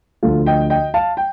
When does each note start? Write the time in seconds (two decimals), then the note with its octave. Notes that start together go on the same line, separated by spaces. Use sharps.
0.23 D2 D3 F3 F4 A4
0.46 D#5 G5
0.70 D#5 G5
0.94 F5 A5
1.17 G5